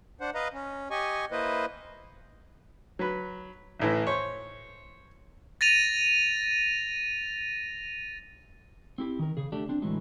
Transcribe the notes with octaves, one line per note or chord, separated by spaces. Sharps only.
D4 C5 F#5
B4 D#5 F5 A#5
C#4
G4 D#5 G#5 C#6
A#3 E4 B4 C5 D#5
F#3 B4
A1 A2 E3
C5 C#5
A6 A#6 D#7 F7
C4 E4 G4
D#3 A#4
C#3 G#4
A3 D4 G4
C4 D4
A2 D3 E3 F#3 G#3